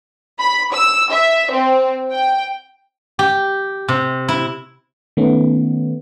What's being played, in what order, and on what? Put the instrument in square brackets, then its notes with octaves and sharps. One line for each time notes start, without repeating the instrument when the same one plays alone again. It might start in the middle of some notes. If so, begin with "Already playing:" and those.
[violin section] B5
E6
E5
C4
G5
[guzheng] G4
C3
E4
[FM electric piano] D#3 A3 B3 C#4